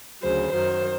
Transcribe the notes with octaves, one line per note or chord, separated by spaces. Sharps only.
D2 C#3 F#3 C5
F#2 D#3 F#3 C5